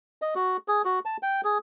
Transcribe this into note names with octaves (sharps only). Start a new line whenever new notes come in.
D#5
F#4
G#4
F#4
A5
G5
G#4